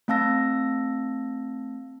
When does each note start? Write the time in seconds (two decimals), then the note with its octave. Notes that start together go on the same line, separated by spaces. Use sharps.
0.08 A3 C4 F5 A5 E6 A#6